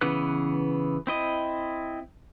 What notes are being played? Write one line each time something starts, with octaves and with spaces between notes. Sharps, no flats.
C#3 E3 B3 B4 F#6
C4 E4 D#5